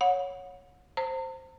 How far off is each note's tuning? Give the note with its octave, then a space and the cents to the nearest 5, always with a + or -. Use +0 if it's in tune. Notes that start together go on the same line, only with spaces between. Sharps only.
C#5 +0 F#5 -25
C5 +0 A#5 -45